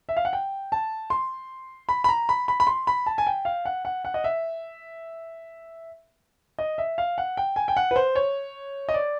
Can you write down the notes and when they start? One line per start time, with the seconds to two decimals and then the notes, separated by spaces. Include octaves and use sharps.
0.09 E5
0.17 F5
0.25 F#5
0.33 G5
0.72 A5
1.10 C6
1.89 B5
2.04 B5
2.09 A#5
2.29 B5
2.48 B5
2.60 B5
2.67 C6
2.87 B5
3.06 A5
3.18 G#5
3.27 G5
3.45 F5
3.65 F#5
3.85 F#5
4.05 F#5
4.14 D#5
4.24 E5
6.59 D#5
6.78 E5
6.98 F5
7.18 F#5
7.37 G5
7.56 G#5
7.68 G5
7.77 F#5
7.91 B4
7.96 C5
8.15 C#5
8.89 D#5
8.94 D5